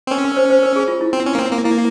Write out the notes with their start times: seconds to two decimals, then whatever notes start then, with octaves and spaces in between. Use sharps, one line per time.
0.07 C4
0.11 C#4 A#4
0.24 A#4
0.37 C5
0.50 C5
0.63 A#4
0.76 G#4
0.88 F4
1.01 E4
1.13 C4
1.26 C#4
1.35 A#3
1.39 C4
1.51 A#3
1.64 A#3 E4